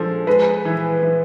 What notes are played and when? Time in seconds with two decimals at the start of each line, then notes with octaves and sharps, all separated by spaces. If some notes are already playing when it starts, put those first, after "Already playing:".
Already playing: D3 F3 G#3 A4
0.27 G#3 B4
0.65 E3
1.02 E3